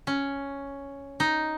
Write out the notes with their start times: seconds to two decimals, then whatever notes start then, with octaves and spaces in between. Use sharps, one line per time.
0.07 C#4
1.20 D#4